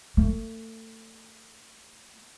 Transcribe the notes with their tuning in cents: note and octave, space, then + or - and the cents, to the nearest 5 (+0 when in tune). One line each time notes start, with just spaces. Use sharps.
A3 +30